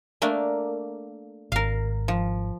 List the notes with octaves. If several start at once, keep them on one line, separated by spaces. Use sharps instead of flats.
A3 A#3 D4
G#1 A#4 F5
F3